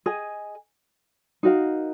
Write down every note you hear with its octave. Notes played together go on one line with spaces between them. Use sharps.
G#4 D#5 G#5
D#4 F#4 A#4 F5